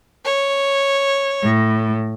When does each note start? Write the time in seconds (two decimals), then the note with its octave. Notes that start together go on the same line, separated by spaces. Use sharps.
0.25 C#5
1.44 A2